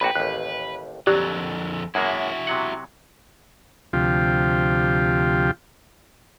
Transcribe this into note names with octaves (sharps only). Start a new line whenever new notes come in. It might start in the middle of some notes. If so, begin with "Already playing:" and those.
A#1 A#2 F#4 B4 G5 B5
A1 D#2 F#6
F2 D3 F#3 G4 D5 F#6
F#2 G#3 A#3 E4 F#4
C3 F#3 F#5
D2 C3 F3 F4 G4